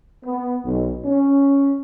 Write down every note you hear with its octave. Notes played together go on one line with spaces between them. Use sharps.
B3
B1
C#4